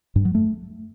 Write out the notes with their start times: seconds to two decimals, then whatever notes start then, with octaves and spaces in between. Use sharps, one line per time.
0.16 G2
0.25 F#3
0.35 A3